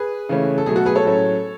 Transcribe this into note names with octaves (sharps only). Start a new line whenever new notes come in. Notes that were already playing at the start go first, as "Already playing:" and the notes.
Already playing: G#4 B4
C#3 E3 A3 C#4
A4
B2 F#3 A3 G#4
F#4 A4
G#4 B4
A4 C#5
A2 F#3 A3 C#4